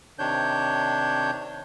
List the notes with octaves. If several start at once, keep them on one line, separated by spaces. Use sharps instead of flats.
C3 D#3 D4 C#5 G6